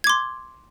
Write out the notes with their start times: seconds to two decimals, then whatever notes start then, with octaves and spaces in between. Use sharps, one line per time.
0.04 G#6
0.07 D6
0.09 C6